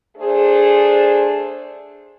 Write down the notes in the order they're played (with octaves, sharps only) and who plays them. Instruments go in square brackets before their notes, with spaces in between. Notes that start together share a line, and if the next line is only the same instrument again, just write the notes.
[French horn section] A3 D4 G#4 C5